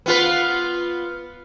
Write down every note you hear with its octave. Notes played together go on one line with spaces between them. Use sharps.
B3 F4 B4